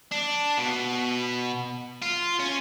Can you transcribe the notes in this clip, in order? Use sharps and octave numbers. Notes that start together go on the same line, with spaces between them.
D4
B2
F4
C#4